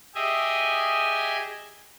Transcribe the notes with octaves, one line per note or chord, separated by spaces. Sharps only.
G4 G#4 D#5 E5 G#5